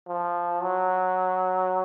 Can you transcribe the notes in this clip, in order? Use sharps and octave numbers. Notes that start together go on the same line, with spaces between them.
F3
F#3